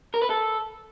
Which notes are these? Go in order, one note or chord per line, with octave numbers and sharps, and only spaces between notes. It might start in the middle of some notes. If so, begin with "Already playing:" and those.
A#4
B4
A4